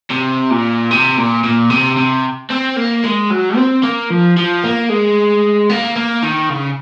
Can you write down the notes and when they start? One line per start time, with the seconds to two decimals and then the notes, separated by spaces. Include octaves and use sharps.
0.10 C3
0.50 A#2
0.91 C3
1.17 A#2
1.44 A#2
1.70 C3
1.97 C3
2.51 C4
2.77 A#3
3.04 G#3
3.31 F#3
3.56 C4
3.84 A#3
4.11 F3
4.37 F3
4.64 A#3
4.89 G#3
5.69 A#3
5.96 A#3
6.23 D#3
6.50 C#3